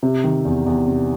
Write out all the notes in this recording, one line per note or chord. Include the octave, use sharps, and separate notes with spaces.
C3
D#3
E2
E2
C3